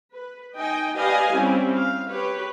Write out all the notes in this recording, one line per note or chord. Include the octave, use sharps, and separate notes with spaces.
B4
D#4 D#5 G5 G#5
G4 B4 D5 D#5 F5 G#5
G3 C4 C#4 E4
F5
G4 B4 C#5